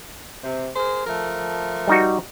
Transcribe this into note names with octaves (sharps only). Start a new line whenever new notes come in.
C3
G#4 A#4 C5
F3 A3 A#4
G3 D#4 F#4